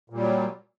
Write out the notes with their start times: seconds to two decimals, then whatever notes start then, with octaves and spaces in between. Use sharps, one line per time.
0.10 A#2
0.14 G3
0.18 F#3